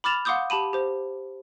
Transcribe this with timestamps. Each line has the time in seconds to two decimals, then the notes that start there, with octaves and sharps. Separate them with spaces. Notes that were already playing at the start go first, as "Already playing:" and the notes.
0.04 B5 D6 F6 A6 E7 F7
0.25 F5 F#5 C6 D6 D#6 G6
0.50 G4 A5 B5 D#7
0.73 G4 C5